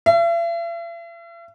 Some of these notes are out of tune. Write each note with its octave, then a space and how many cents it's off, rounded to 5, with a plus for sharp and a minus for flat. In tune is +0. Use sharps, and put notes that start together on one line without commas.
E5 +45